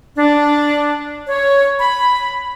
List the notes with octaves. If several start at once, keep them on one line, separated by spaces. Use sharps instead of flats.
D4
C#5
B5